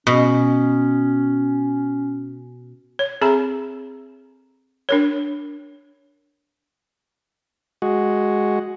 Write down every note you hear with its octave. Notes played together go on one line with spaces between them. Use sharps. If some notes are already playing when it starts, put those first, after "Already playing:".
B2 C#4
C#5
C4 G#4 A4 E5 A#5 B5
D4 A#4 C#5
G#3 F#4